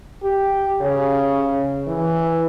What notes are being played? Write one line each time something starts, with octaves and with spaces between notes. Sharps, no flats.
G4
C#3
E3